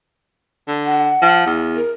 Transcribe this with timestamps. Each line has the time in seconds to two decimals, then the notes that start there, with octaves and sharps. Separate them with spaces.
0.68 D3
0.86 F#5
1.22 F3
1.46 E2
1.76 A#4